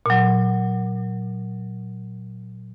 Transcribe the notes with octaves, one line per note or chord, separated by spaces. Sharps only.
A#2 F#3